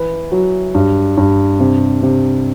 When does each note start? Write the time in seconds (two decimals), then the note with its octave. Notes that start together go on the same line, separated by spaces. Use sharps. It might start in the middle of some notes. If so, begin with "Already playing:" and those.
Already playing: E3 B4
0.32 F#3
0.75 G2
1.17 G2
1.60 C3
2.03 C3